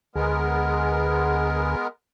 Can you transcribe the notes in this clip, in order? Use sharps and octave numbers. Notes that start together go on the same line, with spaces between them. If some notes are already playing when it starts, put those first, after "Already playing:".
D2 G#3 B3 G#4 A#4